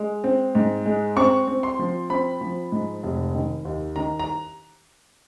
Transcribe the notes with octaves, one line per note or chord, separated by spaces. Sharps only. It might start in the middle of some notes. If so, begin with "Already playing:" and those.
Already playing: G#3
C4
G#2
G#3
C4 C#6
C4
C6
F3
C4 B5
F3
G#2
F1
D#3
D#2
D#3 A#5
A#5